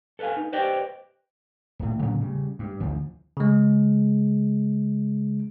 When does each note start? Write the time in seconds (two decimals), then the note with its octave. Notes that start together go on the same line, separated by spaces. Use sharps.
0.19 A4 B4 C#5 F5 G#5
0.37 D#4
0.52 G4 B4 C5 D5 D#5 G5
1.79 D#1 A2
2.02 A2 C#3 F#3 B3
2.21 C#3 G3
2.59 G2
2.80 A1 D2 D3 F3
3.37 C#3 G#3